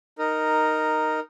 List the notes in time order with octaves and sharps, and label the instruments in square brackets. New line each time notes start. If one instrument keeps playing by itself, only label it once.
[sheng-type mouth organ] D#4 A#4